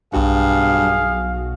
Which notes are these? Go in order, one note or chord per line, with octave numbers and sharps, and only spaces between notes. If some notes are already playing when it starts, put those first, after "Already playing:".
B1 G2 F#4 G#4 F5